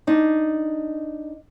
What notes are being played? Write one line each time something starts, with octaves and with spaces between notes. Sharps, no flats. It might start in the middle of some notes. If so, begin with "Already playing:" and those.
D4 D#4